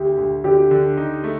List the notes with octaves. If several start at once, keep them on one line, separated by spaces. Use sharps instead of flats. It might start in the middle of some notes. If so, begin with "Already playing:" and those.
Already playing: D2 G4
D2
D3 G4
D3
D#4
A3